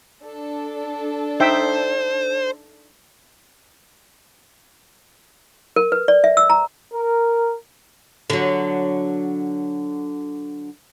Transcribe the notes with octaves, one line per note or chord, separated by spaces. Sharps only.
D4 A4
D#4 C5 E5 G5
A#4
B4
D5
E5
E6
A#5
A#4
D3 F#3